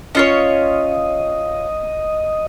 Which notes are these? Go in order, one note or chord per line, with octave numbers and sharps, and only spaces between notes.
C#4 F4 C#5 D#5